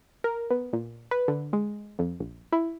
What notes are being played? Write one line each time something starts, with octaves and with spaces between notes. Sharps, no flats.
A#4
B3
A#2
B4
D3
G#3
F2
A#1
E4